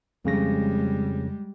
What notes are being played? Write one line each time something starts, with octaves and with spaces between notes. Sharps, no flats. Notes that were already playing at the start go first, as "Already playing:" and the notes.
F2 C#3 G3 G#3 A#6